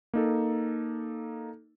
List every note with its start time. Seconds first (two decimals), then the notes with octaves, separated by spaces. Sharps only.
0.14 A#3 D#4 A4